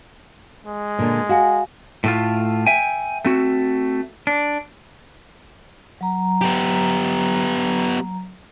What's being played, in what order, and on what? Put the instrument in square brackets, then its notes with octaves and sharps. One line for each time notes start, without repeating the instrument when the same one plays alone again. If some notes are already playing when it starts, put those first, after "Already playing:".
[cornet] G#3
[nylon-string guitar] A#2 D3
[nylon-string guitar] F#4 [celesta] F5 G#5
[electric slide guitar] A2 A3 F4
E5 G5 G#5
A3 C4 F#4
D4
[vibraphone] F#3 A#5
[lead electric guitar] B3 G4